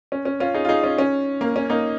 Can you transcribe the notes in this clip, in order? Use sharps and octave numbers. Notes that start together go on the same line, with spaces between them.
C#4
C#4
C#4 F4
D#4 G#4
F4
D#4 G#4
C#4 F4
C#4
A#3
C#4
A#3 D#4